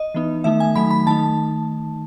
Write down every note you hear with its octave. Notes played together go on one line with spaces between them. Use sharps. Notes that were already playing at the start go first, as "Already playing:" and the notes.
Already playing: D#5
E3 B3 D#4
D#3 A3 D#4 E5
G#5
D#3 F#3 A3 D#4 B5
B5
D#3 A3 D#4 A5